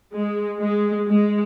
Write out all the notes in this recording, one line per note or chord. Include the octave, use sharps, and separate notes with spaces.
G#3
G#3
G#3